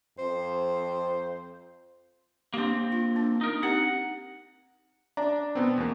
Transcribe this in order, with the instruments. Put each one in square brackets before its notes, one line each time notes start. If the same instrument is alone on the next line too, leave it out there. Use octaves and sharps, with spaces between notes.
[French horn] F2 [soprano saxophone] C5
[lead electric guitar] A#3 C4 [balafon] D4 G4
[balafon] F4
D4
[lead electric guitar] D#4 A#4
[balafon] C4 D#4 G4 [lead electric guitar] F#5
[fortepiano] D4 [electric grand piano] A#5
[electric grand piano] B2 B3 C4
E2 A#3